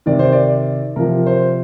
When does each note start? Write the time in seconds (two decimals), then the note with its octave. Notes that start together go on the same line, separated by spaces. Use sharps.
0.06 C3 D#3 D5
0.19 C5
0.33 D5
0.96 C3 F3 A#4
1.26 C5